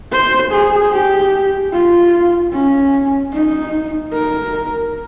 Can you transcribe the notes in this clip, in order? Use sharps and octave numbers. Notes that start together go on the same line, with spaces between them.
C5
G#4
G4
F4
C#4
D#4
A#4